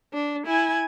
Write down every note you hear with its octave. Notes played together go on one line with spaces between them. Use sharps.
D4
E4 G#5